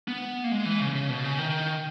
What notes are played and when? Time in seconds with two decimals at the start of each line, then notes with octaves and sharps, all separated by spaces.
0.08 B3
0.44 A#3
0.51 G#3
0.65 E3
0.81 C#3
0.95 C#3
1.10 B2
1.24 C#3
1.38 D#3